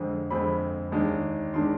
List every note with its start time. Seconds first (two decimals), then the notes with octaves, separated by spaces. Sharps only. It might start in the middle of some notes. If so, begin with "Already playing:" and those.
Already playing: F2 D3 G#3 C4
0.30 F2 D3 G#3 C4 B5
0.92 D#2 D#3 G#3 D4
1.54 D#3 G#3 D4 C6